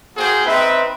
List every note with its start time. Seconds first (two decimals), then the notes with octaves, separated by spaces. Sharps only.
0.17 A#3 F#4 G#4 C5 G5
0.46 C4 D#4 B4 E5